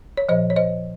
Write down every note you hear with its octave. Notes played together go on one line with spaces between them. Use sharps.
C#5
A#2 F3 C5 D#5
C#5
C5 D#5